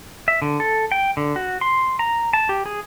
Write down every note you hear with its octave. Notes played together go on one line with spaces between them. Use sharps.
E5
D3
A4
G5
D3
F#4
C6
A#5
A5
G4
G#4